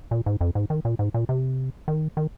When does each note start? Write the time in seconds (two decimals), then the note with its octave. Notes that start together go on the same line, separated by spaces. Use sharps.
0.11 A#2
0.26 G#2
0.41 F2
0.55 G#2
0.70 D#3
0.85 A#2
0.99 G#2
1.14 A#2
1.29 C3
1.88 D#3
2.17 D#3